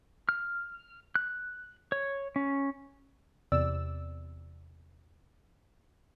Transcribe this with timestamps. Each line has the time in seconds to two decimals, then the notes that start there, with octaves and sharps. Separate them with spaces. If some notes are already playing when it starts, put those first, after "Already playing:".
0.29 F6
1.15 F#6
1.92 C#5
2.36 C#4
3.52 E2 C3 D5 E6